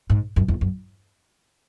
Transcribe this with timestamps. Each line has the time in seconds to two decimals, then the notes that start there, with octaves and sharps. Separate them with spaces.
0.10 G#2
0.36 F#2
0.48 E2
0.61 F#2